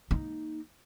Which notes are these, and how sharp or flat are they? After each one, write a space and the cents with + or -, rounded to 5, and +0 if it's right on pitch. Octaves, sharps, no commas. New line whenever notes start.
A#3 +0 D#4 +0